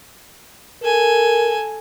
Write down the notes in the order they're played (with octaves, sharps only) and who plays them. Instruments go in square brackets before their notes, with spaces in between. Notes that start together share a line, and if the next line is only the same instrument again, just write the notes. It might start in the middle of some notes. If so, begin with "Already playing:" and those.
[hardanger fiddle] A4 G#5 [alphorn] A#4